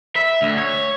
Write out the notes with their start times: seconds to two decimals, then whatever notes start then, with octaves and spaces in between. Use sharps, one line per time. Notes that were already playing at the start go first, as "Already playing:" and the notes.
0.16 E5
0.42 D2
0.58 C#5